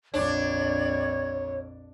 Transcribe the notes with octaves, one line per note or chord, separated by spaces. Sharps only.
A#1 F2 D4 C#5 D5 G#6